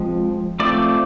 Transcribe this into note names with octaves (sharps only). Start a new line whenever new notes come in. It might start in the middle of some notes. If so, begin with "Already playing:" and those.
Already playing: F3 G#3 C4
F3 A3 C4 D5